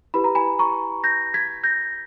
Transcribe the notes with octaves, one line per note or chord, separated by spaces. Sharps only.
E4 G4 B4 B5
A#5
G#5 B5
A#5 C#6
G6 A#6
G#6 B6
G6 A#6